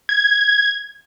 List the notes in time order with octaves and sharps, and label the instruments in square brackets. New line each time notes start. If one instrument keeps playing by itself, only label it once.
[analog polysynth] G#6